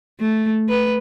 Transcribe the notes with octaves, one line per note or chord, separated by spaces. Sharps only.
A3
B4